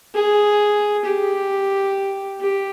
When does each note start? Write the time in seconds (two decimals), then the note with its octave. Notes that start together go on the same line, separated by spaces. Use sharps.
0.14 G#4
1.05 G4
2.40 G4